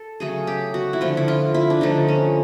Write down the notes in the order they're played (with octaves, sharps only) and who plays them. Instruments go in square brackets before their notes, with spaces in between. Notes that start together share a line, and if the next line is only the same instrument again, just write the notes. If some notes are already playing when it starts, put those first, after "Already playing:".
Already playing: [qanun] A4
C#3 F#3 A3 G#4
G4
F#4
E4
D3 F3 A3 F4
E4
F4
E4
D4
D3 F3 A3 D#4
C#4